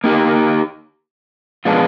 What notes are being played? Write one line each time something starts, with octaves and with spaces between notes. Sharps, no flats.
A#3 D#4 G4
F3 G#3 B3 D4 F4